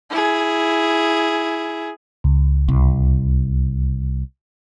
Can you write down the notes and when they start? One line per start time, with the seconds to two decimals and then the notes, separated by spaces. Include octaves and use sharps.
0.10 E4 G#4
2.24 C#2
2.68 C2